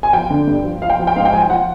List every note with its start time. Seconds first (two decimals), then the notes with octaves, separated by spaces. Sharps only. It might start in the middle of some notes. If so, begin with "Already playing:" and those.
0.03 G#5
0.13 F3 G5
0.30 D3
0.47 G2
0.64 F3
0.82 F3 F5
0.90 G5
0.99 F3
1.07 G5
1.16 G#2 F5
1.25 G5
1.33 F3 G#5
1.42 G5
1.50 F3 F#5